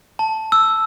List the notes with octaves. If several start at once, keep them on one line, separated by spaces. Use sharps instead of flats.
A5
E6